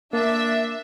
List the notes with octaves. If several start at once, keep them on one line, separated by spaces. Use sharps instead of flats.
A#3 D4 E5